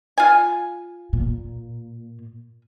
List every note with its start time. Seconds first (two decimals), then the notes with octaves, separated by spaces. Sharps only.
0.18 F4 G#5
1.13 A#2